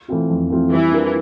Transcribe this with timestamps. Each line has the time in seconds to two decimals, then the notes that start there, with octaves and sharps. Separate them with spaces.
0.08 E3 A3 C4 F4
0.30 F2
0.50 E3 A3 C4 F4
0.71 E3 G3
0.92 D4 F4 A#4